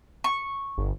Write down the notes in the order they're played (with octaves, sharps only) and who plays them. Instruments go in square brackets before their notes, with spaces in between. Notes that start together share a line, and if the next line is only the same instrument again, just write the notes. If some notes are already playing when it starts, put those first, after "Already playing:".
[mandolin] C#6
[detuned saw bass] G1